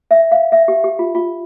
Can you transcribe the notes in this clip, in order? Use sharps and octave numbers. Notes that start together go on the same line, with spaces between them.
E5
F5
E5
G4
G4
F4
F4